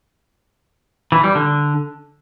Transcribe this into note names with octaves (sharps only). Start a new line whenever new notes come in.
E3
G3
D3